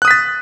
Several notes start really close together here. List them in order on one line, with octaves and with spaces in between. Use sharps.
F#6 D#6 B6 A6